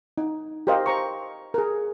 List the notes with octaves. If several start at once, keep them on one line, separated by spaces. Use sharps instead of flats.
D#4
G4 A#4 C5 D#5 F5
C5 A#5 C#6
G#4 A#4